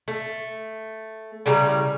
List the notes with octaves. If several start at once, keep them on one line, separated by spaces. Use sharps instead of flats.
A3
A2 C#3 G3 A#5